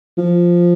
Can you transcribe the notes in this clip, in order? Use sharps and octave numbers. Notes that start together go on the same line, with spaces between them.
F3